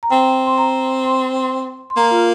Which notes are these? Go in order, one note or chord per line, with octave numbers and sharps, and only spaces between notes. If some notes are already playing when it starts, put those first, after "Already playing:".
A#5
C4 G5
C6
A#5
C6
C6
C6
A#3 A#5
F4